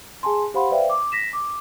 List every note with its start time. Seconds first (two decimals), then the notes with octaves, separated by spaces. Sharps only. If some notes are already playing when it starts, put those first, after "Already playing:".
0.23 G#4 G#5 A5 C6
0.54 G4 C5 F5 F#5 B5 C6
0.70 B4 C5 D5 E5 F5 G5
0.90 D6
1.12 A#6 B6 E7
1.33 D6